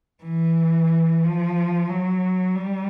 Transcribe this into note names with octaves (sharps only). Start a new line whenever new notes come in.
E3
F3
F#3
G3